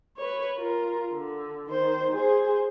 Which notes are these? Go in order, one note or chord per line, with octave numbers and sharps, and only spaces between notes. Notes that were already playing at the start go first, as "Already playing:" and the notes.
B4 C#5
F4 A#4
D3
D#3 C5
G#4 C5